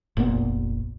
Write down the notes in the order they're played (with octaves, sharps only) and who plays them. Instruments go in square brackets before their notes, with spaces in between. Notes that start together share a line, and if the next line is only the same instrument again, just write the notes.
[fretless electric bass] F1 A#1 A#2 B3